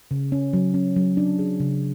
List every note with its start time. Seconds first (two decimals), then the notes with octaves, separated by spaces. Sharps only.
0.11 C#3
0.32 C#4
0.53 F#3
0.74 C#4
0.96 F#3
1.17 D4
1.39 G#4
1.60 C#3